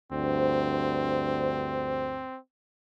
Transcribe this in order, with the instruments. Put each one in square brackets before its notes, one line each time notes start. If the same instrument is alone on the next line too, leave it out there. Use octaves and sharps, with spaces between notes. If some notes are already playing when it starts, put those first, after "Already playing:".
[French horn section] D2 G2 C5 [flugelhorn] C4